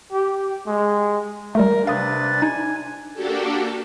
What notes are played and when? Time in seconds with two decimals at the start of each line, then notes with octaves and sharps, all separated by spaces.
0.12 G4
0.67 G#3
1.55 G3 A3 A#4
1.87 C3 D4 B4 F5 D#6 A6
2.42 D#4 G#5
3.14 A#3 D4 F#4 G4 A4